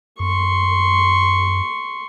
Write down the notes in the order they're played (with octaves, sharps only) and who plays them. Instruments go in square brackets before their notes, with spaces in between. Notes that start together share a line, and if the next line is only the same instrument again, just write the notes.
[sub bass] F#2 [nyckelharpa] C6 C#6